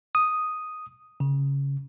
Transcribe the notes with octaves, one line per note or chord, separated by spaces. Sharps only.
D#6
C#3